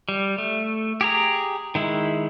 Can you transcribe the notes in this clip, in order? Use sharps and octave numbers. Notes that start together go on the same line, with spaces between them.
G3
A3
G4 G#4 A#5
D#3 G#3 E4